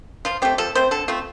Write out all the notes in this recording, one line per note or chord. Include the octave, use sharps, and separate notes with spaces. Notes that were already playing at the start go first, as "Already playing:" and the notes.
F3 F4
A3 C4 G4
F3 A4
A3 C4 C5
D3 A4
A3 C4 F4